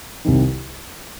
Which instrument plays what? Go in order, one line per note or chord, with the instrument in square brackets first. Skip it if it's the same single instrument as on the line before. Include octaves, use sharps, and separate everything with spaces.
[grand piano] C2 C3 D#3